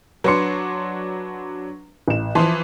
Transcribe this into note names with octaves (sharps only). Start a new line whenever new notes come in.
F#3 D4 B4 C6 C#7
A1 E7
E3 F3 A5 C6